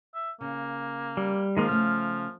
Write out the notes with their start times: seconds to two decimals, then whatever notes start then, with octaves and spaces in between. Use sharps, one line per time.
0.15 E5
0.41 C#3 A#3
1.17 G3
1.57 D#3 F3 G#3 A#3
1.69 C#3 A3 F6